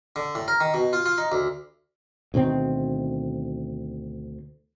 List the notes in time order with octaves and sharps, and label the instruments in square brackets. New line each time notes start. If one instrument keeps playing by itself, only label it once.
[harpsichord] D3
A2
A#4
D#3
B2
F4
F4
D#4
D2
[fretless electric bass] D2 B2 D#3 C4